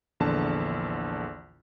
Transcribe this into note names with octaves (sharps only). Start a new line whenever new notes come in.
A#1 E2 D3 A5